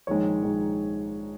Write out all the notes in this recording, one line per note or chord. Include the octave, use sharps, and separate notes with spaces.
A#1 G#2 D#3 G#3 C#5
A#1 G#2 D#3 G#3